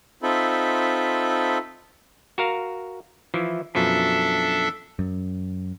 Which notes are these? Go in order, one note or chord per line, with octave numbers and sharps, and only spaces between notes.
C4 D#4 F4 A4 E5 B5
F#4 A#4 F5
E3 F3 E4
F#2 B2 F3 D4 A4 E5
F#2